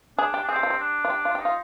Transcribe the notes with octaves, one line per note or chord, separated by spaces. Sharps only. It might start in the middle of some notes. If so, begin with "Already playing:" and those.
D4 G#4
G4
D4
C4 G#4
G4
F4
G4
D4
F4
G4
F4
G4
D#4
F4